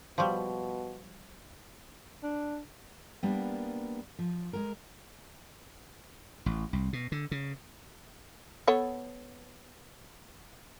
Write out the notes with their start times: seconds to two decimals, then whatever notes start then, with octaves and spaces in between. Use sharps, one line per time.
0.18 B2 F3 G3 F5 C6 C#6
2.23 D4
3.23 G3 A#3 B3 D4
4.19 F3
4.53 G#3 A#4
6.46 A1
6.73 C2
6.93 B2
7.12 D3
7.31 C#3
8.67 B3 A4 C#5